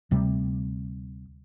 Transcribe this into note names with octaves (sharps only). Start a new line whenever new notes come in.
D2 C3 G3